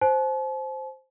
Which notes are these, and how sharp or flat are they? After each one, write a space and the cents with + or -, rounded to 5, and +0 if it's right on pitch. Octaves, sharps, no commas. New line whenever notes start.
C5 +0 A5 -45